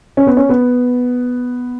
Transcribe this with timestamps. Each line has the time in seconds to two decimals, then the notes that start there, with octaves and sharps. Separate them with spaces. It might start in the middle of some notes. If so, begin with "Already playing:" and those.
0.17 C#4
0.27 B3
0.37 C#4
0.49 B3